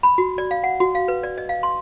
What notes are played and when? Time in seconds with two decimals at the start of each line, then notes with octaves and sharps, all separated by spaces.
0.03 B5
0.18 F#4
0.38 D5
0.51 F5
0.64 F#5
0.80 F#4
0.95 F5
1.08 B4
1.23 D5
1.38 D#5
1.49 F5
1.63 C6